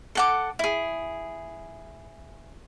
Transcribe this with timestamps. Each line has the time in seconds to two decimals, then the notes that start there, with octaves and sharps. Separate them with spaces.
0.15 A4 F#5 D6
0.59 E4 G#4